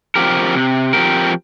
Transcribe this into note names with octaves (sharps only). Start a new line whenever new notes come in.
F3 C4 G4 A#4
C3
F3 C4 G4 A#4